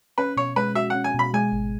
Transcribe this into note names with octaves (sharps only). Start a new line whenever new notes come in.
C#4 B4
B2 C#5
G#3 B4
F#4 E5
C#4 F#5
G#5
B2 B5
G#3 G#5
G#1